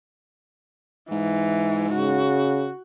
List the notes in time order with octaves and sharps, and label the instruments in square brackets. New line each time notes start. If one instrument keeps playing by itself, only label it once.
[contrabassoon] G#2 [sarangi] E3
[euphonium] C#3 [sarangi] F#4